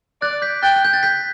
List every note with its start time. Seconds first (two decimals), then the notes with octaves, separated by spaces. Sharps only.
0.22 D5 F#6 A6
0.42 G6 B6
0.63 G5 F#6 A6
0.76 F#6
0.85 G6
0.93 A6
1.03 G6 B6